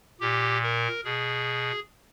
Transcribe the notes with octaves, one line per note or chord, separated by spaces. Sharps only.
A#2 G4
A#4
B2 G#4